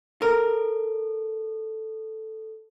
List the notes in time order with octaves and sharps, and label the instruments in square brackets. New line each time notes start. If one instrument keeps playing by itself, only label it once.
[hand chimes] A4 [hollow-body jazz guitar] A#4